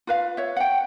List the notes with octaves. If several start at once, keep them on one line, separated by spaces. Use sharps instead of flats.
F4 B4 F5
C#5 E5
F#5 G5